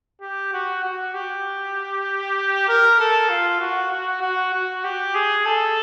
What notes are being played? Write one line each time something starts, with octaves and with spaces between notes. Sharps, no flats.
G4
F#4
F#4
G4
A#4
A4
F4
F#4
F#4
F#4
F#4
G4
G#4
A4